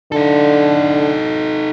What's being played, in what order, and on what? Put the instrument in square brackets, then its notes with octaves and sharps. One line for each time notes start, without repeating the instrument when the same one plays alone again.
[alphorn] D3 [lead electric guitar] D#4 A4